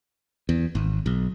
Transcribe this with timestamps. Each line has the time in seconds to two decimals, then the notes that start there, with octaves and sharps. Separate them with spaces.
0.49 E2
0.75 G#1
1.06 B1